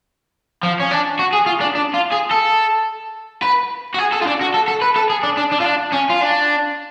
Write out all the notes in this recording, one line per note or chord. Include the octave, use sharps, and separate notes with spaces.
F3
C#4
D4
F#4
G#4
F4
D4
D4
F4
G#4
A4
B4
F#4
G#4
A4
F4
D4
F#4
A4
A4
B4
A4
G#4
D4
D4
D4
F4
D4
C#4
F4
D4